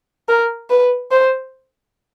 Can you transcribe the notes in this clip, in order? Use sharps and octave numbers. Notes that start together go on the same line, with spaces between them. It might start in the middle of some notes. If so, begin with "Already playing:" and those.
A#4
B4
C5